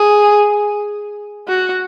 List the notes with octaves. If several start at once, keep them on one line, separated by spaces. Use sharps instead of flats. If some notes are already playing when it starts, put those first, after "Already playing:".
Already playing: G#4
F#4